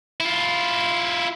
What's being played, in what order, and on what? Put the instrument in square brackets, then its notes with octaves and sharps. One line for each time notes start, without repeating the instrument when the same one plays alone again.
[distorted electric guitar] E4 F4